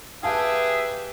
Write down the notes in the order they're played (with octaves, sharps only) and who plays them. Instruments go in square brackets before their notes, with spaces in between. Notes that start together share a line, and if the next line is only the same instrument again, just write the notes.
[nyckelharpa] G4 B4 [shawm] G#4 [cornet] E5 [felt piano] F5 G#5 A5